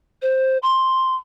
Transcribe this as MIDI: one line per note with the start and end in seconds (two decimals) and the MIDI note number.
0.22 0.58 72
0.63 1.15 84